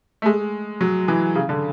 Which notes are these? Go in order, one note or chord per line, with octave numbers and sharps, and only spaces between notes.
A3
G#3
F#3
E3
C#3
D3